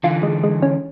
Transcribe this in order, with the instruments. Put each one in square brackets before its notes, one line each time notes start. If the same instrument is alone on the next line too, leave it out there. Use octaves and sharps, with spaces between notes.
[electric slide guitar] D3 E3 [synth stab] F4
[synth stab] G#3
G#3
C#4